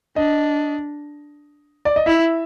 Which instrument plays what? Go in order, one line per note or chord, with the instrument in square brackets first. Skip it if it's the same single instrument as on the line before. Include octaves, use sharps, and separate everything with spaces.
[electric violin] D4 [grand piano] D#5
[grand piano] D5
D#5
[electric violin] E4 [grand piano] E5